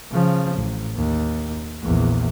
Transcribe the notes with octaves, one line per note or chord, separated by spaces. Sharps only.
C#3 F3
A1
D#2
A#1 E2